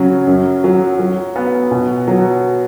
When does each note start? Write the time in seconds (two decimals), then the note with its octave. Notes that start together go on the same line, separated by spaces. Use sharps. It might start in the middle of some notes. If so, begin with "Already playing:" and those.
Already playing: C#3 F#3
0.27 F#2
0.64 F#3
0.99 F#3
1.36 B3
1.71 B2
2.07 F#3